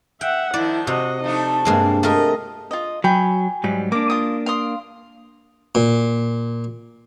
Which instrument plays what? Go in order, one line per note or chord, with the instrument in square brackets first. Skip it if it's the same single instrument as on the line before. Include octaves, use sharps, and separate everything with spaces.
[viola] E5 F#5 [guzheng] G5
[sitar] D#3 F3 [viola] E4 [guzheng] D5
[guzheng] C3 [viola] F#4 D#5
[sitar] F3 A3 D4 [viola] D#4
[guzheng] G2 G#3 C4 [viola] A#3
[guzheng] A3 A#4 [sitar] F4 [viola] D#5
[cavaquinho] F4 D#5
[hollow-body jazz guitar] F#3 [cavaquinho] G5 G#5 B5
[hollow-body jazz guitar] G#2 F#3 G3
[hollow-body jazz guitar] A#3 D4 [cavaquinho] D6
[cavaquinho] F4 D#6
F5 C6 D#6
[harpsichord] A#2